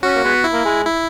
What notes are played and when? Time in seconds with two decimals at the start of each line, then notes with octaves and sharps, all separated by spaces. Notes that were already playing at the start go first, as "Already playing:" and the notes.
0.03 C#4 F#4
0.15 A#3
0.24 G#3 B3
0.44 E4
0.53 A#3
0.65 G#3
0.85 E4